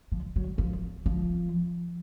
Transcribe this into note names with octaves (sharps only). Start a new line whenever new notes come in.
F3
F#3
F3
F3